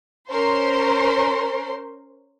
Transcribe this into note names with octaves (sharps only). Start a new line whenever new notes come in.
C#4 A#4 C5 C6